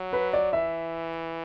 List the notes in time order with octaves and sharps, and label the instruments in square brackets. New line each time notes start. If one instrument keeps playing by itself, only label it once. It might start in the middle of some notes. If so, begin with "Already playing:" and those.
Already playing: [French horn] F#3
[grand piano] B4
D5
[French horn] E3 [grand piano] E5